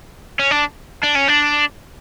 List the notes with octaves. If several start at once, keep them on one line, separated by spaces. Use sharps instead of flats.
C#4
D4
D4
C#4
D4